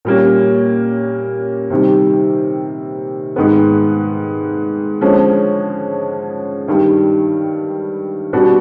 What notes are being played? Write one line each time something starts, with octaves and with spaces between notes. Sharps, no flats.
A#2 G3 A#3 C#4
C3 D#3 G3
G#2 D#3 G#3 B3
D3 F3 G#3 C#4
G2 D#3 G3
B2 G3 B3 D4 F#4